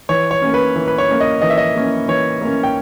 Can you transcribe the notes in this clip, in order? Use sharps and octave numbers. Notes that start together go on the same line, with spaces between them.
E3 C#5
C#5
A#3 C#4
B4
E3
B4
C#5
A#3 C#4
D#5
E3 D#5
E5
D#5
A#3 C#4
E3 C#5
A#3 C#4
G5